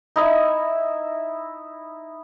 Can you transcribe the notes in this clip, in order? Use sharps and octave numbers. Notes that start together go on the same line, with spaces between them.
D#4 E4 E5